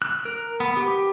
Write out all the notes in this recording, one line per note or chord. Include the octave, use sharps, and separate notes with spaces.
F#6
A#4
B3
G4